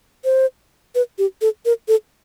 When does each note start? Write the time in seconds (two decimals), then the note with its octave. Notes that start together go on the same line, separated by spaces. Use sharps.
0.25 C5
0.95 B4
1.18 G4
1.41 A4
1.65 A#4
1.88 A4